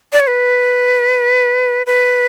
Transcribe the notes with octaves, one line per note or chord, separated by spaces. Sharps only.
D5
C#5
B4
B4